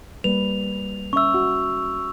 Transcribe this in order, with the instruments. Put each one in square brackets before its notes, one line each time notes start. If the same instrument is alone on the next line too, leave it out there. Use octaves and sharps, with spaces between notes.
[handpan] G3 A#3 B4 [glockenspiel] F7
[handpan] C#4 E5 [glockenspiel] C#6 E6
[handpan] F#4